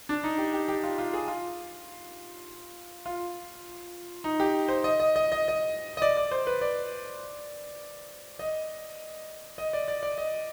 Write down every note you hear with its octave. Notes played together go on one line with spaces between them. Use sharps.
D4
D#4
G4
G4
G4
F4
F4
G#4
F4
F4
D#4
G4
C5
D#5
D#5
D#5
D#5
D#5
D#5
D5
D5
C5
B4
D5
D#5
D#5
D5
D5
D5
D#5